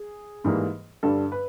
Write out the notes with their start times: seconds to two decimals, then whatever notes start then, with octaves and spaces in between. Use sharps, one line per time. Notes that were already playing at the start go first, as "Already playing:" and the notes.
Already playing: G#4
0.44 G#2 E3 G3 A#3
1.03 G2 D3 G3 A4
1.32 B4